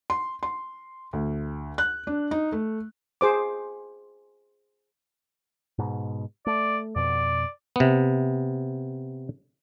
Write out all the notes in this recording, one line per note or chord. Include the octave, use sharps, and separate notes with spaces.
C6
C6
D2
F#6
D4
D#4
A3
G#4 C5 D6
G#2 B2
A3 D5
F2 B2 D5
C3 B3